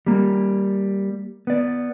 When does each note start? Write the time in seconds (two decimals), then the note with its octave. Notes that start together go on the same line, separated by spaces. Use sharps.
0.07 G3 A#3
1.47 B3 D5